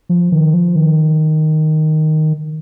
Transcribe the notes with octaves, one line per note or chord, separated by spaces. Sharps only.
F3
D#3
F3
D#3